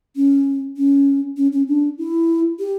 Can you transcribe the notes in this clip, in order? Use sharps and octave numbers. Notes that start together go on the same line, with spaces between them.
C#4
C#4
C#4
C#4
D4
E4
G4